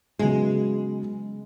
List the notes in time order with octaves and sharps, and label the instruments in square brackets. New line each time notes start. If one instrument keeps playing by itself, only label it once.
[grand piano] C#3 F#3 B3 [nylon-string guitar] G#3